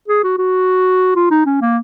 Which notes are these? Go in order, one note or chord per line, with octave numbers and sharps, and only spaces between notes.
G#4
F#4
F#4
F4
D#4
C#4
A#3